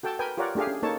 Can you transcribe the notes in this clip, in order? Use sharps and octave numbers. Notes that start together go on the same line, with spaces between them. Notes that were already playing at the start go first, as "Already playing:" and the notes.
F#4 A4 G5 A5
A#4 B4 G5 G#5
F4 G4 A#4 C#5 D5 F#5
A3 D4 G4 G#4 F5
C#4
A#3 D#4 A4 C#5 A5